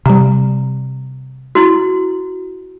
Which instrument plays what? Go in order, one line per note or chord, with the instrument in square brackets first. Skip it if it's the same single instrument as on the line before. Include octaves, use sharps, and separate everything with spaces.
[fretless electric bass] C3 G3 [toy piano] A#5
[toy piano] E4 F#4